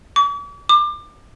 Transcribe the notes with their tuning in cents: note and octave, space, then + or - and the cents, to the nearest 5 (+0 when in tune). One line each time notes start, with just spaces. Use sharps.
D6 -45
D6 +25